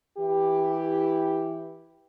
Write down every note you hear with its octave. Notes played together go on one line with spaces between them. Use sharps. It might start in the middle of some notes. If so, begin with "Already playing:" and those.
E3 E4 G4